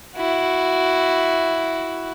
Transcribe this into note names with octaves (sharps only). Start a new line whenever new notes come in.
E4 F#4